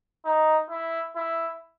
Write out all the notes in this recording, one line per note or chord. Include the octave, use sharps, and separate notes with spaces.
D#4
E4
E4